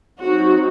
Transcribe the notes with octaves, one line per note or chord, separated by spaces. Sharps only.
F#3 C4 D#4 F#4